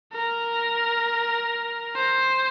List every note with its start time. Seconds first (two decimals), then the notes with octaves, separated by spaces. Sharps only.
0.12 A#4
1.95 C5